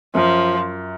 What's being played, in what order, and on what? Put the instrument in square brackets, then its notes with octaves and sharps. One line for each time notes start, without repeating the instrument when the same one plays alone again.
[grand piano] F#2 [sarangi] F3